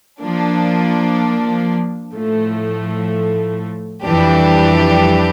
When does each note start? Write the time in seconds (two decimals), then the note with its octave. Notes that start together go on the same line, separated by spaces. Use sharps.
0.20 F3 A#3 D4
2.13 A2 F3 A3
4.05 F2 E3 G3 D4 G4